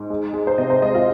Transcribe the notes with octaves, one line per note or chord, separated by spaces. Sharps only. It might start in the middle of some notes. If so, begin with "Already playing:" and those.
Already playing: G#2
G#3
G#3
C5
C3 D#5
C5
G#3 D#5
F4 F5